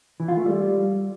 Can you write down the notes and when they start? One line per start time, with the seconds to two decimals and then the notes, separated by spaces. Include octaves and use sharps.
0.20 E3
0.28 F4
0.37 A3
0.46 G3